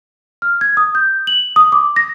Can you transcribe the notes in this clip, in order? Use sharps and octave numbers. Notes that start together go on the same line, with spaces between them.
F6
G#6
D#6
G6
F#7
D#6
D6
A#6